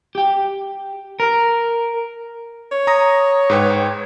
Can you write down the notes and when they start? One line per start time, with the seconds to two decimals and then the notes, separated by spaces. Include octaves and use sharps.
0.15 G4 G5
1.20 A#4
2.71 C#5
2.87 A#5 D#6 A#6
3.50 G#2 B4 G5